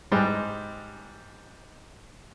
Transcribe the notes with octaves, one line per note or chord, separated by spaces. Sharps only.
G#2 G3 G#3